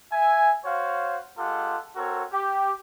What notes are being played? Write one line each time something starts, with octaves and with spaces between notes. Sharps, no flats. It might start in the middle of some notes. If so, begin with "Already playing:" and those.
E5 G#5
F#4 C5 C#5 F5
G#3 F4 G4 A4 F#5
C4 F#4 A4 A#4 C#5
G4